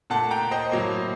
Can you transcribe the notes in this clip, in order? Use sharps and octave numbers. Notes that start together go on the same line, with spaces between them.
A#2 A3 F#5 A5
G5 A#5
C5 D#5
A2 F#3 A#3